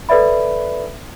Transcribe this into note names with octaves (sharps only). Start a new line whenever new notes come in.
A4 B4 D5 E5 B5